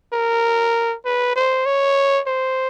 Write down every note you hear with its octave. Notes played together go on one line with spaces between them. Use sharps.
A#4
B4
C5
C#5
C5